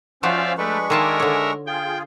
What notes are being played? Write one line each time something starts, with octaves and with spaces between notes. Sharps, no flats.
F3 C#4 F4 F#4 C5 D5 E5 F5
G#3 A3 D4 B4 B5 C#6
D#3 F4 A4 A#4 E5 G#5 A5 D6
D3 C#5
F4 G#4 G5